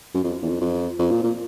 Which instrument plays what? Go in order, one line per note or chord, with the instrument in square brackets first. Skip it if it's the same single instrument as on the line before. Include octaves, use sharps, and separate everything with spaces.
[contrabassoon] F#2
F2
E2
F2
F2
F2
A#2
A#2